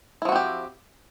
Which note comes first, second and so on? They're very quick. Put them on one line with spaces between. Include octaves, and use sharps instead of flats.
E4 F3 F#4 C4 G4